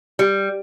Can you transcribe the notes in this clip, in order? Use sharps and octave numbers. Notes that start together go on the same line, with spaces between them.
G3